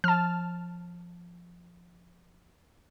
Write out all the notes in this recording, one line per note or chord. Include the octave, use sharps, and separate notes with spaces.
F3 A5 F6